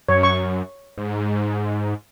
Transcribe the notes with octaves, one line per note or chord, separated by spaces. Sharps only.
F#2 C#5
C#6
G#2